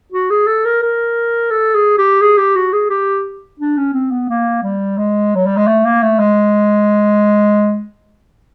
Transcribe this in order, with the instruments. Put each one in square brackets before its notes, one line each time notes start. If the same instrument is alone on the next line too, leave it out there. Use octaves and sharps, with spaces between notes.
[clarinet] F#4
G#4
A4
A#4
A#4
A4
G#4
G4
G#4
G4
F#4
G#4
G4
D4
C#4
C4
B3
A#3
G3
G#3
F#3
G3
G#3
A3
A#3
A3
G#3